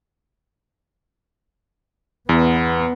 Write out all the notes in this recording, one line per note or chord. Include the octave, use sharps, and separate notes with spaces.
E2 B3